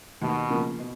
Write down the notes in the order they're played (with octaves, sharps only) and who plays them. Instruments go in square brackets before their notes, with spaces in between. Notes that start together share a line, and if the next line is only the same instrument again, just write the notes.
[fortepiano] D#2 [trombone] B2
[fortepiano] C#3 F3 A#3
B2